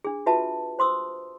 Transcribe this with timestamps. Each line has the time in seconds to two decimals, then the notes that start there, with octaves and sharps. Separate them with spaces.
0.04 D4 G#4
0.26 F4 F#4 B4 E5 A5
0.79 C5 C6 D#6 E6